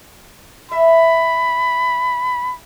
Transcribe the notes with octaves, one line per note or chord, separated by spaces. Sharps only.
E5 B5